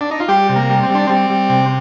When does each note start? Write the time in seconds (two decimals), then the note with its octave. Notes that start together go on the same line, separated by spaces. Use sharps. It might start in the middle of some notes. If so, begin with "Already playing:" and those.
0.01 D4
0.11 D#4
0.20 F4
0.28 G3 G4
0.49 C3
0.56 A#3
0.70 G3
0.83 C4
0.90 G3 D4
1.07 G3 C4
1.30 G3
1.49 C3